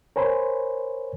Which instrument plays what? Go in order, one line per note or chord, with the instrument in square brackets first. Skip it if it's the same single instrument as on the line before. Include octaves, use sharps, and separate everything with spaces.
[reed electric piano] A#4 C5 C#5 G#5 B5 C6